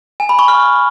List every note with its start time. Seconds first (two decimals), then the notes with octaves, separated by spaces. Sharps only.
0.20 G#5
0.29 B5
0.39 C#6
0.48 F6